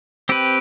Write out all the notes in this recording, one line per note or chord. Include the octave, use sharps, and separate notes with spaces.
C4 G4 B4